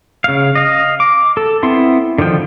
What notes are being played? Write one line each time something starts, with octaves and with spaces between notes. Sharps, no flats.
C#3 F5
D#5 F5
D6
A4
B3 C4 E4 C6
D3 D#3 F3 G5